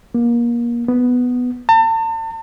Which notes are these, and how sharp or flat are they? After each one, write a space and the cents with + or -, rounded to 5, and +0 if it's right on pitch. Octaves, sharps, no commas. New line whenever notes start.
A#3 +30
B3 +5
A5 +40